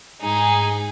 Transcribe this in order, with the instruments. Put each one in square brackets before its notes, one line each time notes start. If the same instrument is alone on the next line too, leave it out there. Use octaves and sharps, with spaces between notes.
[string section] G#2 G#4 [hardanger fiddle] D#4